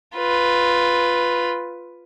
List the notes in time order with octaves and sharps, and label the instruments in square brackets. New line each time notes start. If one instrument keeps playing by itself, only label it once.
[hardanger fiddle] F4 B4